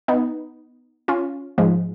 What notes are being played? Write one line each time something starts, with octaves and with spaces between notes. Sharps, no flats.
B3 D#4
C#4 F4
G#2 F3 G#3